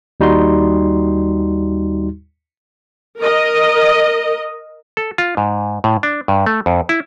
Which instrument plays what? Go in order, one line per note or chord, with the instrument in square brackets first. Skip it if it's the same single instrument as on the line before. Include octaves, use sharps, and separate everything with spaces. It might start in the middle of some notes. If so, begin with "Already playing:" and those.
[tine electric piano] D#2 G3 D#4 F#4 C6
[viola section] A#4 D#5
[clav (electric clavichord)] A4
F4
G#2
A2
D4
G2
A3
F2
E4